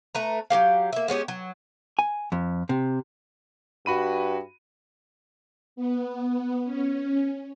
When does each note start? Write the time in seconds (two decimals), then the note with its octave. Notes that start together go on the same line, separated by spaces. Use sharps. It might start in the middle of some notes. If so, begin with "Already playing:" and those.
0.15 A3 B4 A#5
0.50 F#3 F#4 G4 F5
0.93 A#3 E5
1.08 G#3 B3 C#4 G4
1.28 F#3
1.99 G#5
2.32 F2
2.69 C3
3.86 G2 F#4 B5 D#7
5.76 B3
6.65 C#4